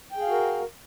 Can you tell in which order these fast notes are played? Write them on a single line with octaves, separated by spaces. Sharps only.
G5 G#4 F5 F#4 A#4